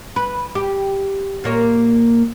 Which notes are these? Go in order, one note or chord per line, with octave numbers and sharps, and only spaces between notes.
B4
G4
A#2 A#3 C#5